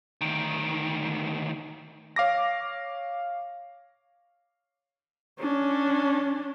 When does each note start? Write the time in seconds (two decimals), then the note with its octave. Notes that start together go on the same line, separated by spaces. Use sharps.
0.21 D2 D#3
2.16 C#5 F5 D6 A#6
5.39 C#4 D4